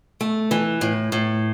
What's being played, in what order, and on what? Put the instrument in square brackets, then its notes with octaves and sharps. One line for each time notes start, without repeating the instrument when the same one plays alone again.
[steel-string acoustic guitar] A3
E3
A2
A2